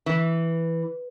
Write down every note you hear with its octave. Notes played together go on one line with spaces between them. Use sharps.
E3